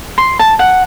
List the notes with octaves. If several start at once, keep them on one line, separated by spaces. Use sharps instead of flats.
C6
A5
F#5